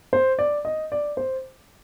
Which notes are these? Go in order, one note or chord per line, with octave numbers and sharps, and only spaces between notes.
C5
D5
D#5
D5
C5